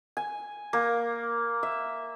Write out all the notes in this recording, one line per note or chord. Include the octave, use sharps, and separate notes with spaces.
G#5
A#3
E5